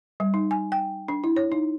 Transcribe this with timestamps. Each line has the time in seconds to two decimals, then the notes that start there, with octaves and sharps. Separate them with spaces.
0.20 G3
0.34 D#4
0.51 G#5
0.72 G5
1.08 D4
1.24 E4
1.36 C#5
1.52 D#4